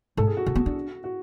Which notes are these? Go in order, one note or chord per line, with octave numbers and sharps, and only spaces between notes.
G#2 A4
G#4
F#4
C#3
B3
D4
F#4